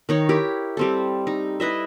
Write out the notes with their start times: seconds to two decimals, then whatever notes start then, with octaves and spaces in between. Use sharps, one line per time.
0.09 D#3 D#4 C#5
0.29 E4 G4 A#4
0.77 G3 C4 A4
1.27 D#4
1.60 E4 B4 D#5 E5